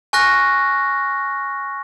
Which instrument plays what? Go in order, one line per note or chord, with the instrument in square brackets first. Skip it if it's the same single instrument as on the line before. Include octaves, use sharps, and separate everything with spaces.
[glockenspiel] G#5 C#6 F6 F#6 A#6